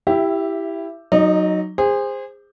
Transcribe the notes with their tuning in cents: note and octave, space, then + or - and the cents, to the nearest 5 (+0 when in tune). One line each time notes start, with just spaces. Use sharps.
E4 +0 G4 +0 E5 +20
F#3 +0 D#4 +0 D#5 -40
G#4 -30 C5 +0